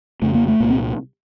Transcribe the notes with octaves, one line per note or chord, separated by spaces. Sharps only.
F2 C#3 A3
A#3
A3
C2 A#2 A#3
C4